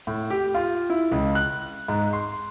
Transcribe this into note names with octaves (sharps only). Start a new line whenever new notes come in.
A2
G4
F4
E4
C#2
F#6
G#2
C6